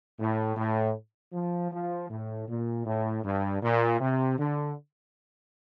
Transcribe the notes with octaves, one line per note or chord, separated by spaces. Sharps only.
A2
A2
F3
F3
A2
A#2
A2
G2
A#2
C3
D3